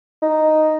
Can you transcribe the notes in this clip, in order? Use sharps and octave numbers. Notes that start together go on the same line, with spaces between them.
D#4